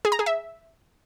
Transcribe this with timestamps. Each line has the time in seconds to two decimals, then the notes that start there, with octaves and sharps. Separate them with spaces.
0.05 G#4
0.12 A#5
0.19 G#4
0.26 E5